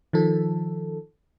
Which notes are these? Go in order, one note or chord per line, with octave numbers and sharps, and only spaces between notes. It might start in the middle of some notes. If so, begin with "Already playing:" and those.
D#3 F3 A4